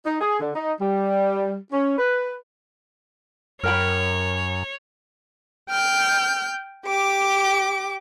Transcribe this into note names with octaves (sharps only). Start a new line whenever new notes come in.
D#4
G#4
D3
D#4
G3
C#4
B4
F#2 A#4 C#5 G5 B5
G5 F6 G6
G4 D6